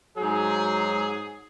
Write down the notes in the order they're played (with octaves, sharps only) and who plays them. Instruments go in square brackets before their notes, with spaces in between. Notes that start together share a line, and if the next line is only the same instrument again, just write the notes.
[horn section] G#2 F#3 G#4